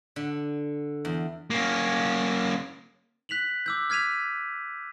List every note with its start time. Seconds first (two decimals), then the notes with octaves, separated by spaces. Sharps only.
0.16 D3
1.05 E2
1.50 A#3 C#4
3.29 F#6 B6 F7 F#7
3.66 D6 E6 G6
3.90 F6 G#6 B6 D#7 F7